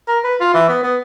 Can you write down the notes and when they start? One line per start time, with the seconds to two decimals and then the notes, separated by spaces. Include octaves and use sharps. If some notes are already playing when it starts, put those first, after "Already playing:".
0.08 A#4
0.24 B4
0.41 F4
0.54 E3
0.69 B3
0.83 B3